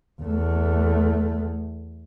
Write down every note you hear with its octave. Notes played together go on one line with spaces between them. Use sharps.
E2 A3